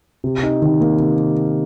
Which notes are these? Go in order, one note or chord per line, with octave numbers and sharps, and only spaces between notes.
C3
D#4
D#3
A#3
C3